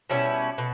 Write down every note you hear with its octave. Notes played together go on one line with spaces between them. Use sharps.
B2 G3 C#4 E4
B2